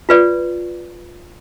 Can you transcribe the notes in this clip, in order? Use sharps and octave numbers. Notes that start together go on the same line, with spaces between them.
F4 B4 D5